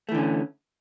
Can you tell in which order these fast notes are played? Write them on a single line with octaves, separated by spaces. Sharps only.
A3 E3 D3 C#4